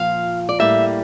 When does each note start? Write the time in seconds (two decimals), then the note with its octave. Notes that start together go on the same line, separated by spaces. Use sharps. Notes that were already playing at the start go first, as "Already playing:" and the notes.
Already playing: A#2 F3 F5
0.49 D5
0.60 A2 G3 A#3 E5